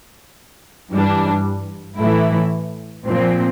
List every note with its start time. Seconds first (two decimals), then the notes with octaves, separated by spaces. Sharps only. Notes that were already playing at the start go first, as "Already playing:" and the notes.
0.90 G2 E3 G3 D4
1.98 A2 E3 A3 E4
3.05 A#2 F3 C4